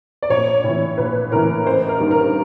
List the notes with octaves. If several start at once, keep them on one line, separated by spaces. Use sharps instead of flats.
D5
A#1 C#5
A2 E3
A#1 B4
A2 E3 A#4
A1 C5
A#4
G2 D#3
A#4